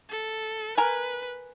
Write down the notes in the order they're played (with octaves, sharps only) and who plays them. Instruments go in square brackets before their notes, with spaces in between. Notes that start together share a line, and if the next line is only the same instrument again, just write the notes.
[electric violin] A4
[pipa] A#4 G#5 [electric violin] B4